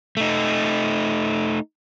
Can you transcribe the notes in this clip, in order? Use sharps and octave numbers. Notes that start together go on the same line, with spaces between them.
A3 D#4